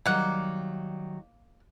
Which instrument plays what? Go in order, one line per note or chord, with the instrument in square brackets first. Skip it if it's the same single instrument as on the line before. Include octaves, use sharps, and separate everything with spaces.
[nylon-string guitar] D#3 F#3 G3 [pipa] A#3 F#5